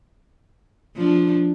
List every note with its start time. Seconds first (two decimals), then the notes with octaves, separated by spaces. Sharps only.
0.96 F3 D4